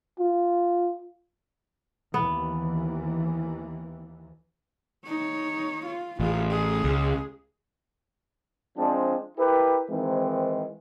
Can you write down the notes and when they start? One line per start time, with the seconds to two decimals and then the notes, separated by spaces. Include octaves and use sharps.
0.19 F4
2.14 D#2 E3 B3
5.06 D#4 C#5
5.86 F4
6.20 A1 F4 G#4
6.51 G#4
6.84 C#2
8.76 F3 G#3 C4 D4
9.38 E4 G4 A#4 B4
9.90 G#2 D#3 E3 G#3 C4